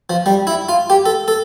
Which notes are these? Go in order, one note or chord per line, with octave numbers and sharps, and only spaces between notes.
F3
G3
E4
F4
G4
A4
A4